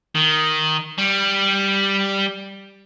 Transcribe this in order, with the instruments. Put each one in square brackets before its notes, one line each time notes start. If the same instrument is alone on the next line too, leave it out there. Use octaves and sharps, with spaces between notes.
[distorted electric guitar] D#3
G3